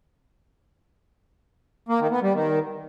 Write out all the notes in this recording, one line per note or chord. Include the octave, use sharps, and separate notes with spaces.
A#3
D#3
B3
G3
D#3